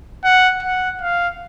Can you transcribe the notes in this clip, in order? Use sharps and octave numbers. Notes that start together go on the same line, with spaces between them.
F#5
F#5
F5